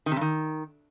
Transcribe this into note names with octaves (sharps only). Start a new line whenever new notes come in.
D#3
C3
G2
D#3